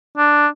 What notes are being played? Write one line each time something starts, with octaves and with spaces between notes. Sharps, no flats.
D4